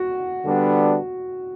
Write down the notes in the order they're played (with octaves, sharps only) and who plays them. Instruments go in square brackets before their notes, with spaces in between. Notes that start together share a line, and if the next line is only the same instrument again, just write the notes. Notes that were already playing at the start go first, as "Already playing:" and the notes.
Already playing: [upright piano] F#4
[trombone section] D3 G3 B3 D4